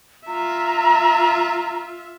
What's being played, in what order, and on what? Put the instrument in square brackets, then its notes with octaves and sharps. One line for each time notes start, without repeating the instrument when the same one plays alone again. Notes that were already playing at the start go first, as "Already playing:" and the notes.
[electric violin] F4 E5 [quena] A#5